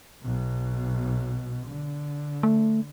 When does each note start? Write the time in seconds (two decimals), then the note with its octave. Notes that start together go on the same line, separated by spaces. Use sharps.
0.23 B1 B2
1.67 D3
2.43 A3